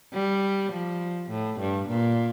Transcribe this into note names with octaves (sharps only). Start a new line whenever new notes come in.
G3
F3
A2
G2
A#2